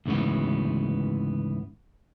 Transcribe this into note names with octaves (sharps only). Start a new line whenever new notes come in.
D2 G#2 C#3 E3 B3